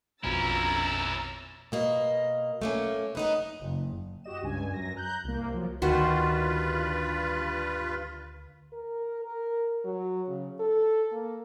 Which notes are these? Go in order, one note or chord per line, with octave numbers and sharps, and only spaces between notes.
A#1 F2 B2 C#4 E4 A#5 E6 A6
B2 A#3 D#5
A3 A#3 C#4
B3 D#4 B4
F#1
F#4 G4 D#5 E7
C#2 G2 G#5
F#2 A#6
A#5 F#6 G6
C2 A#3
F3 F#3
D2 G2 D#3 F4 F#4 B4 C5
A#4
A#4
F#3
C#3
A4
A#3